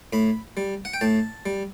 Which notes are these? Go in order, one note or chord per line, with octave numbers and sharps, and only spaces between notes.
A2 B5
G3
F#5
G5
A2 A5
G3